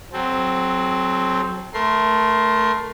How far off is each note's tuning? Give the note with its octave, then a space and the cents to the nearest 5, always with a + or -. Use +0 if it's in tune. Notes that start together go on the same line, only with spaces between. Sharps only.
F#3 +0 C4 +0 A4 -45
A3 +0 A#4 +20 C6 +0